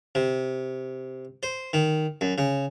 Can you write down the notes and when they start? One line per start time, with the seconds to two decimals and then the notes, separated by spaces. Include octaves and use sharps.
0.15 C3
1.43 C5
1.73 D#3
2.21 F#2
2.38 C#3